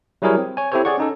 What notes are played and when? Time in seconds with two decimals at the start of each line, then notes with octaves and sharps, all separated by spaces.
0.22 F#3 G3 E4 G#4 A#4 C#5
0.38 C4
0.57 C#5 G#5
0.72 C4 E4 G4 A4 C5 C#5
0.85 G#4 C#5 D5 F#5 C#6
0.98 C#4 D#4 A4